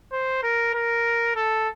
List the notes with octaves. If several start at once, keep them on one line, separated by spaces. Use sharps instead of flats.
C5
A#4
A#4
A4